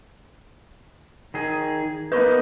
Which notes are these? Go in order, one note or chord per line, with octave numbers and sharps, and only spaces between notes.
D#3 G#4
A#3 B3 D#4 B4 C#6